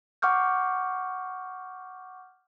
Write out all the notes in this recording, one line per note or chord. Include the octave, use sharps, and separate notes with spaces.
F#5 C#6 D6 F6 G6